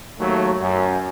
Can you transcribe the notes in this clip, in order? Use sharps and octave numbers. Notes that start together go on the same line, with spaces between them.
D#2 F#3 A3
F#2